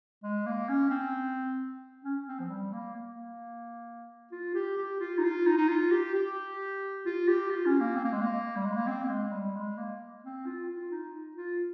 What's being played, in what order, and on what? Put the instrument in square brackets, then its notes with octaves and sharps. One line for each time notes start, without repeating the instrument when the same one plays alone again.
[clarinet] G#3
A#3
C#4
C4
C#4
C4
F3
G3
A#3
A#3
F4
G4
G4
F4
D#4
F4
D#4
D#4
F4
G4
G4
F4
G4
F4
C#4
A#3
C4
A#3
G#3
A#3
G3
G#3
A#3
C4
A#3
G#3
G3
G#3
A#3
C4
F4
F4
D#4
F4